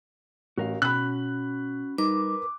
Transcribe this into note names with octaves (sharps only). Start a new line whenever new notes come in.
A1 F#4 A#4 F5
B2 C#4 F#4 B5 F#6
G3 D#4 A#4 B4 D6